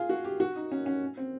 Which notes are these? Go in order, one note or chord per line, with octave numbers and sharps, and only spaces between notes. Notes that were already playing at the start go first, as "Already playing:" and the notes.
Already playing: F4 G#4
F#4
G4
F#4
D#4
C#4
C#4
C4